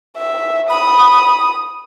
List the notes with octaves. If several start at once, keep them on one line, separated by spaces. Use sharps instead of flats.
E5
B5 D#6